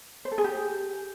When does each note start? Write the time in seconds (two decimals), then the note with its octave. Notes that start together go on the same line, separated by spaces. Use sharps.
0.25 C5
0.31 A4
0.38 G#4
0.44 G4